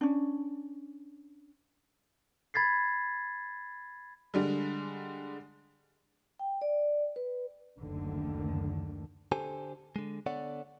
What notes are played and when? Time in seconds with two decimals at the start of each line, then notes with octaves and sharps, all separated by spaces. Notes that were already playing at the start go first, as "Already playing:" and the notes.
0.01 C#4 D4
2.54 B5 G#6 A6 B6 C7
4.34 D3 G3 G#3
6.39 G5
6.62 D5
7.16 B4
7.78 F#1 D2 D3 D#3
9.32 D3 G4 A4 C5 G#5
9.96 D3 G#3
10.26 D3 B3 A4 C#5 D5 F#5